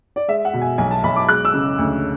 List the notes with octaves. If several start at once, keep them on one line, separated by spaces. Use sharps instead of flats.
D5
G#3 E5
F#5
B2
G#5
B1 G#5
A5
B1 B5
D6
G#3 F#6
E6
C#3
D2